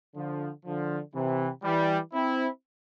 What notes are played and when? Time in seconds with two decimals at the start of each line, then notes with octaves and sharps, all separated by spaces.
0.16 D3 F3
0.66 D3 F3
1.15 C3 E3
1.64 E3 G3
2.14 C4 E4